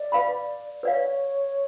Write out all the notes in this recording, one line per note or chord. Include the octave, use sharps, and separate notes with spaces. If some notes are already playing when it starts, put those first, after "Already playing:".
Already playing: D5
B4 F5 B5
B4 C#5 D5 F5